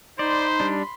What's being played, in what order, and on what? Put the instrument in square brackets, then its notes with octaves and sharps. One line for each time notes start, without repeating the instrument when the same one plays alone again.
[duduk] D#4 [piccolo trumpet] C5 [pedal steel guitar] D5 [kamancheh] B5 C6
[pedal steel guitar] G3 D4